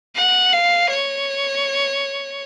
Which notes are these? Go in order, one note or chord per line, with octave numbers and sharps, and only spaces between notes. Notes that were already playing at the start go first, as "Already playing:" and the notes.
F#5
F5
C#5